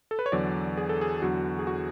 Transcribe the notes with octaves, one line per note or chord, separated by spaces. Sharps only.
A4
B4
C#5
E2 D3 F#3 D5
G#4
A4
G#4
E2 D3 F#3 F#4
G#4
F#4